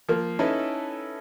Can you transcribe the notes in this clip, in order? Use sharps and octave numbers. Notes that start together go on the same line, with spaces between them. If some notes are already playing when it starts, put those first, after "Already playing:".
F3 A#3
C#4 D#4 E4 A4 B4